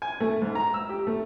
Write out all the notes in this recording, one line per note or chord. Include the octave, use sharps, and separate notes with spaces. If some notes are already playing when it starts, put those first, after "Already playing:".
G#5
A3
G#2
A#5
E6
G4
A3